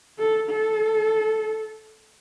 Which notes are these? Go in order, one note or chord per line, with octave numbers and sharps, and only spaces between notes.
A4
A4